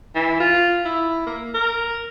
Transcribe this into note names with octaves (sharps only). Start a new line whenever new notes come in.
E3
F4
E4
A#3
A#4